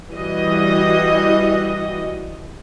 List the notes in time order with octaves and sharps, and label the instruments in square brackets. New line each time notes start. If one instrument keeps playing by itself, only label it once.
[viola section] E3 G3 F#4 D#5